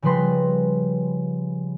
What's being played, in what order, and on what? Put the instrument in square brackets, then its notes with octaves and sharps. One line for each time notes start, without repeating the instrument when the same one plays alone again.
[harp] C#3 F3 G3 B4 C6 A#6